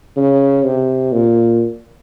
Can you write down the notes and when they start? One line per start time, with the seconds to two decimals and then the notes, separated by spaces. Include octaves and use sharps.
0.17 C#3
0.64 C3
1.12 A#2